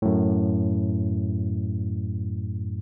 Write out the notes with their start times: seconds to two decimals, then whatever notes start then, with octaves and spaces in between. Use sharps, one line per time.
0.02 F#2 A2